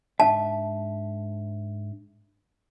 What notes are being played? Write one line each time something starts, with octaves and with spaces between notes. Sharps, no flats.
G#2 D4 E5 A5